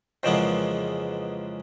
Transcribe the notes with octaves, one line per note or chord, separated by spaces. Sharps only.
F2 C#3 E3 G#3 A#3 B3